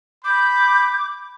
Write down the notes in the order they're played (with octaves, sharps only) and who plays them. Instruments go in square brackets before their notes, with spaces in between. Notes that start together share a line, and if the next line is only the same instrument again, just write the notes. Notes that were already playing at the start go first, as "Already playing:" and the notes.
[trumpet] B5 [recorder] D6 [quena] G6